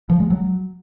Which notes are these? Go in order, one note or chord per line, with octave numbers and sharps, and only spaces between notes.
F3
G#3
F#3